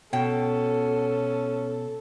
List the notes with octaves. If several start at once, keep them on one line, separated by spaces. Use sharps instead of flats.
B2 C#4 A4 G5